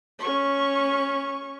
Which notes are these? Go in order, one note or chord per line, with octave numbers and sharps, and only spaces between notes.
C#4 C#6